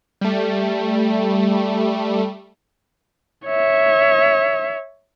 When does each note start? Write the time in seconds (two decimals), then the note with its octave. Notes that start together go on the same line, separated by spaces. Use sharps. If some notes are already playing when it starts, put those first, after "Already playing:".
0.21 G3 A3
3.46 C#5 E5